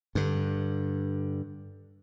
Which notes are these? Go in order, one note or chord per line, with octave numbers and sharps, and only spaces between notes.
G2 D3